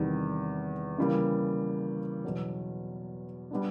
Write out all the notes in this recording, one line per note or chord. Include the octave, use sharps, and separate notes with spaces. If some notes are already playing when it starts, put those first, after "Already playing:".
Already playing: E2 C3 D#3 G3
C#3 E3 G3 A#3
E2 B2 F#3
G3 B3 D4